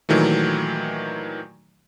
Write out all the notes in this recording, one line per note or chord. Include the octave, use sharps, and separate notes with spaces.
A#2 D#3 E3 F#3 A3